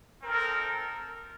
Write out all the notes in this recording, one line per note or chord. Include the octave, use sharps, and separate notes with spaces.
C4 D#4 A4 A#4